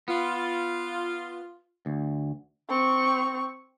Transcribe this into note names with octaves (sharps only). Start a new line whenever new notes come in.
B3 F4
D2
C4 C#6